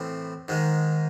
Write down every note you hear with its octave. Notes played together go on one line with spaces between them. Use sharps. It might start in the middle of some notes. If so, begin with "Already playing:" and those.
Already playing: A2 E3 C4
G#2 D#3 G#3